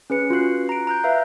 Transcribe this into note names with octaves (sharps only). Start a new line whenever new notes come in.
C#4 G#4 B4 C#7
F4 F#4 F#6 C7
A#5 D7
A#5 F#6 G6
B4 E5 F5